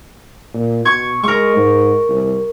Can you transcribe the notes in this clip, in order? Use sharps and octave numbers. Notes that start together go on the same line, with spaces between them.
A#2
B2 C#6 G#6
G#3 A#4 C#6
G#2
C2